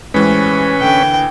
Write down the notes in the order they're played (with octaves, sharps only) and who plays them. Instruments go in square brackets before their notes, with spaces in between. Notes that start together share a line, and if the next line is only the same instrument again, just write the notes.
[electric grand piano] A2 E3 [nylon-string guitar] G#3 G4 C5 [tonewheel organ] C#4 B4
[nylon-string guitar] D3 A#3 [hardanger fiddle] G5